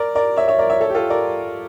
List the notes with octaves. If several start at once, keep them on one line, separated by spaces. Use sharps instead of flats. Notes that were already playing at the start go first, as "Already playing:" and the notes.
Already playing: A#4 D5
A#4 D5
C#5 E5
C#5 E5
A#4 D5
C#5 E5
A4 C#5
G4
F4 A4
A#4 D5